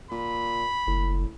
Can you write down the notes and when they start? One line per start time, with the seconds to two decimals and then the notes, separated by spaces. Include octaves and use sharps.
0.11 A#2 B5
0.87 F#1 A2